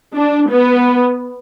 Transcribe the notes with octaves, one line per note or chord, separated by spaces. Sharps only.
D4
B3